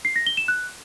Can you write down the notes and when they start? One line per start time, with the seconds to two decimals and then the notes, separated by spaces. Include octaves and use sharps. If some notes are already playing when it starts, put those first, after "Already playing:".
0.05 C7
0.16 A#6
0.27 G7
0.37 E7
0.48 F#6